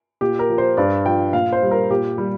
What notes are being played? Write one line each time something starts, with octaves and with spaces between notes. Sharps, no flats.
A#2 G4
A#4
F3
C5
G2 D5
F3 G5
A#2 F5
C5
G3
A#4
A#2 G4
G3